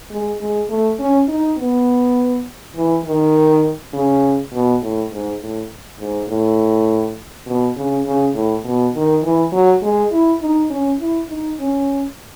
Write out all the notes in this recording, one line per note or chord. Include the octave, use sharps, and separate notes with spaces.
G#3
G#3
A3
C#4
D#4
B3
E3
D#3
C#3
B2
A2
G#2
A2
G#2
A2
B2
C#3
C#3
A2
B2
D#3
E3
F#3
G#3
E4
D#4
C#4
E4
D#4
C#4